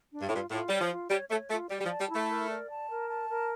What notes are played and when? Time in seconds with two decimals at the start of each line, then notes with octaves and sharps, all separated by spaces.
0.12 D4
0.21 G2
0.29 A2
0.31 G2 F4
0.51 A2 F4
0.69 G3 C#5
0.81 F3
0.91 F4
1.10 G3 C#5
1.30 A3 C#5
1.50 A3 F4
1.70 G3 D5
1.80 G3
1.85 F3
1.90 A5
2.00 G3
2.10 A3 E4
2.30 A#4
2.49 D5
2.70 A5
2.89 A#4
3.09 A5
3.29 A#4